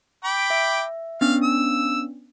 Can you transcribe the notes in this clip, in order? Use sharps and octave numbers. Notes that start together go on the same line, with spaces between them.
G5 B5 D6
E5
B3 C#4 D4 F5
E6